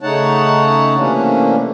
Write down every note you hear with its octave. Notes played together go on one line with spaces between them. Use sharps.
C#3 A3 D#4 C#5 F#5 A5
C3 E3 A3 A#3 C#4 D4